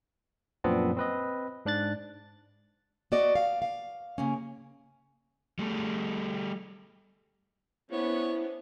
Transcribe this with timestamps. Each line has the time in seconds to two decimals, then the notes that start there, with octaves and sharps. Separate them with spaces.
0.64 F#2 A#2 F3 B3 C4 D4
0.97 C4 B4 D#5
1.66 G#2 D4 F#6 A6
3.12 B3 F#4 D5 D#5
3.35 F5
3.62 F5
4.18 C#3 A#3 C#4
5.59 G3 A3
7.91 B3 C#4 D4 E4 C5 C#5